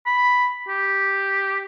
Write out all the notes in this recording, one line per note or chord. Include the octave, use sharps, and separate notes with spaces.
B5
G4